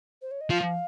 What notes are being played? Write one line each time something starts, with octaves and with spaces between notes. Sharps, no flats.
C5
C#5
D#5
F3 F5